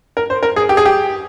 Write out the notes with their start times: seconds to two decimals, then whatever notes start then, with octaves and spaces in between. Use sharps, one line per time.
0.17 A#4
0.30 C5
0.43 A#4
0.56 G#4
0.69 G4
0.77 G#4
0.86 G4